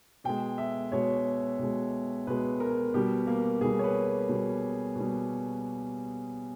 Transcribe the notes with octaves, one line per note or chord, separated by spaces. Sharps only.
B2 G#3 G5
E5
B2 G#3 C#5
B2 G#3
B2 G#3 B4
A#4
B2 G3 G4
A#3
B2 G3 G#4
C#5
B4
B2 G3
B2 G3